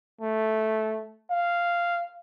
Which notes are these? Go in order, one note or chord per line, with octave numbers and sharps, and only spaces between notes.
A3
F5